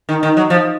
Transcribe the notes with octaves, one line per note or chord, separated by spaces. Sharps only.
D#3
D#3
F#3
F3